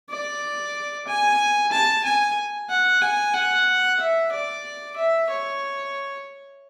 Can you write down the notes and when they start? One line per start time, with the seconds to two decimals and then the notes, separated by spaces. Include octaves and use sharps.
0.10 D5
1.07 G#5
1.72 A5
2.04 G#5
2.70 F#5
3.02 G#5
3.34 F#5
4.00 E5
4.32 D5
4.96 E5
5.30 C#5